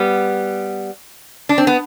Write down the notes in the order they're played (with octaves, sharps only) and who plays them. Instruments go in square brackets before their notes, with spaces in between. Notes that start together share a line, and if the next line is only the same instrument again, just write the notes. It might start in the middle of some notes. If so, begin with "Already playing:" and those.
Already playing: [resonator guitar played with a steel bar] G3 B3
D4
C4
B3